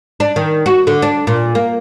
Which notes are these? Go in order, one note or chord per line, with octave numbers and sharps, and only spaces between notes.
D4
D#3
F#4
D3
D4
A#2
A#3